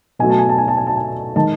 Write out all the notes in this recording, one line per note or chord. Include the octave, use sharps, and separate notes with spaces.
B2 F#3 A3 G#5
A5
G#5
A5
G#5
A5
G#5
A5
G#5
D#3 G#3 A5